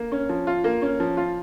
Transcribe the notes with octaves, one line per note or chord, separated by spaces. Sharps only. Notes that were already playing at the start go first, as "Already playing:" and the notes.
Already playing: A#3
C#4
F3
F4
A#3
C#4
F3
F4